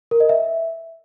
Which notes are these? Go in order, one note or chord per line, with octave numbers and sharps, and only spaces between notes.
A#4
D#5
E5